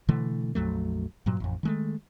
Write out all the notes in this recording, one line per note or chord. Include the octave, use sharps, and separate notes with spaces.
B2 D3 E3 A3
A#1 F2 F#3 A3
G2 A#2 F#3
A1 F2
D#3 G#3 A3